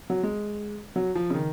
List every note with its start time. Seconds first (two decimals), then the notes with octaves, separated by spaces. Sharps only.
0.10 F#3
0.23 G#3
0.96 F#3
1.15 F3
1.30 C#3
1.34 D#3